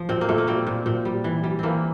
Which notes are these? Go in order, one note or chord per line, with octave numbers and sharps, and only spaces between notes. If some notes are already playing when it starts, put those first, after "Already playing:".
Already playing: F3
A#2 C4
A#3
A#2 A3
A#3
G3 C4
A#2
A#2 C4
G3
E3
G3
E3 A#3 C4